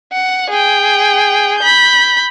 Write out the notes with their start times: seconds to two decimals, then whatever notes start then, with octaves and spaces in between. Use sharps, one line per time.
0.13 F#5
0.50 G#4 G5
1.59 B5 G6